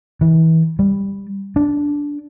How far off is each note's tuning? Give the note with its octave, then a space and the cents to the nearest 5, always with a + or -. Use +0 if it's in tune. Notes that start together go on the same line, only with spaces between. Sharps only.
E3 -30
G3 +10
D4 -10